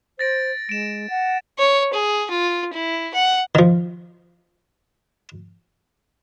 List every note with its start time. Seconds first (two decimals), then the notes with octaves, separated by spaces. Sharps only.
0.19 C5 A6 A#6 D7
0.69 G#3 D7 E7
1.10 F#5
1.58 C#5
1.93 G#4
2.31 F4
2.73 E4
3.14 F#5
3.55 D#3 F3